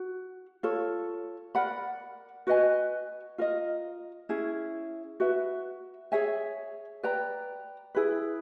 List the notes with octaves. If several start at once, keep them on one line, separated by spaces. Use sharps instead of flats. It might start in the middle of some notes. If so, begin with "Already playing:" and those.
Already playing: F#4
F4 A4 C#5
A#4 D5 F#5 B5
F#4 B4 D#5 G#5
F4 A#4 D#5
C#4 E4 G#4
F#4 B4 E5
G#4 C#5 E5 G#5
B4 D5 G5 A#5
E4 G#4 B4